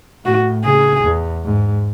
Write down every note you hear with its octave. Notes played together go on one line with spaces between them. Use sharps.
A2 F#4
C#3 G#4
E2
G#2